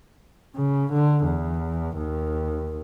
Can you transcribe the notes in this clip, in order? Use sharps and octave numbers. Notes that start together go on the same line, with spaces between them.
C#3
D3
E2
D#2